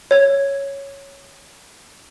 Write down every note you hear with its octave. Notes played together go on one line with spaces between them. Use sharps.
C#5 G#6